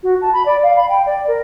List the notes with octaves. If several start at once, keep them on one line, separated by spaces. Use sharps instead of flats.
F#4
A5
B5
D5
F5
B5
G5
D5
A#4